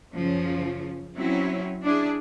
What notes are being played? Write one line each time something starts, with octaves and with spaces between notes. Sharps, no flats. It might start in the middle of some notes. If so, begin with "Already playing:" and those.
F#2 C#3 F3 C#4
F#3 C4 C#4 E4
D4 E4 G#4